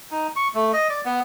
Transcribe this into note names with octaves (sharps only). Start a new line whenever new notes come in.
D#4
C#6
A3
D#5
D5
B3